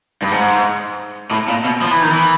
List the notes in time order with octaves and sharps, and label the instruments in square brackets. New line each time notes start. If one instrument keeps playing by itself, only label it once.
[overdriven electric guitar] G2
G#2
A2
A#2
B2
F3
E3
D#3
E3